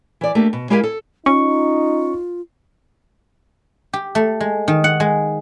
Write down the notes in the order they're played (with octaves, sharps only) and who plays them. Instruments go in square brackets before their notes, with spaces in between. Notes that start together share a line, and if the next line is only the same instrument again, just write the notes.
[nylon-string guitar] E3 D5
A3 A#3 D4 G4
B2
G#3 E4 G4 A#4 F5 G#5
A4
[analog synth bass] C#4 [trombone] D#4 [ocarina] F4 [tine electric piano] C#6
[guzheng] G4
A3
G#3
D#3
F#5
G#3